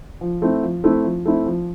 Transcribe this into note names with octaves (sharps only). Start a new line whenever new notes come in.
F3
A3 C4 E4
F3
A3 C4 E4
F3
A3 C4 E4
F3